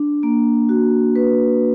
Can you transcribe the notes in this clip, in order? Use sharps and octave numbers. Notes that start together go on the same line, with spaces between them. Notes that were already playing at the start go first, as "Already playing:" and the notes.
Already playing: D4
A#3
F#4
B4